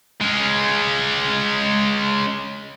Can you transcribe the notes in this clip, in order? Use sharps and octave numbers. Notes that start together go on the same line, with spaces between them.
G#3 C#4